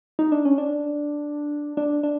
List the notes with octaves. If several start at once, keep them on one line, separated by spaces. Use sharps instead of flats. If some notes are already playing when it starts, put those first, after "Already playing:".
D#4
D4
C#4
D4
D4
D4